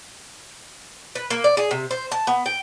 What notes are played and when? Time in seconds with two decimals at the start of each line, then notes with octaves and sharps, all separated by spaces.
1.15 B4
1.30 A#3
1.44 D5
1.57 G#4
1.71 C3
1.91 C5
2.12 A5
2.27 B3
2.46 G5